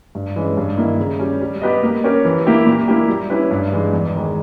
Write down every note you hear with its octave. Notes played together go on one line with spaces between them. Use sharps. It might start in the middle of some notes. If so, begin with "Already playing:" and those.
G2
E3 G#3 C#4
G2
D#3 A#3 E4
C#3
G3 C#4
G3
B3 G4 B4 D#5
A#3
C#4 G4 A#4
E3
A#3 E4 G4
A#2
A#3 E4 G4
G3
C#4 E4 G4 B4
G2
E3 G#3 D#4
E2
D#3 G#3